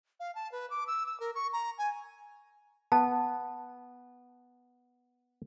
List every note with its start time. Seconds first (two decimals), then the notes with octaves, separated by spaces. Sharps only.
0.20 F5
0.35 A5
0.52 B4
0.70 D6
0.87 E6
1.06 E6
1.20 A#4
1.35 C#6
1.53 A#5
1.78 G#5
2.92 B3 A5